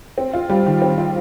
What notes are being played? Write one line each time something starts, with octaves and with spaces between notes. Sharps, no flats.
C4
F4
G3
D#3
C4
F4